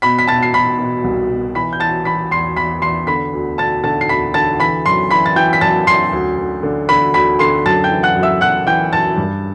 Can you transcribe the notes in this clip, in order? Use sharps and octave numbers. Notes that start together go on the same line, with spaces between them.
B2 B5 B6
B6
B2 A5 A6
C7
B2 B5 B6
B2
C2
B2
E3 B5 B6
G6
E3 A5 A6
E3 B5 B6
E2 C6 C7
E2 B5 B6
E2 C6 C7
D3 B5 B6
D2
D2 A5 A6
D3 A5 A6
C7
D2 B5 B6
D3 A5 A6
E3 B5 B6
F#2 C6 C7
E3 B5 B6
A6
E3 G5 G6
B6
F#2 A5 A6
F#2 C6 C7
D2
D2
D3
D3 B5 B6
D2 B5 B6
D3 C6 C7
F#2 A5 A6
G5 G6
E3
F#5 F#6
F#2
E5 E6
F#2 F#5 F#6
E3 G5 G6
F#2 A5 A6
G2